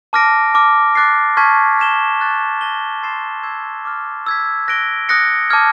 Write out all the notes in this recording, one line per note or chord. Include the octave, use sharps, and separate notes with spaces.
A5 D6 F6 A#6 D7
A5 D6 F6
D6 F#6 A6 C7
A5 C#6 F6 G#6 B6
F6 G#6 B6 E7 G7
C#6 F#6 A6
F#6 A#6 D#7 G7
C6 E6 A6 C7 E7
E6 G#6 C7 E7
D6 F6 A6
E6 G#6 B6
F#6 A#6 D7 G7
D#6 F#6 A#6 C#7
A5 D6 F6 G#6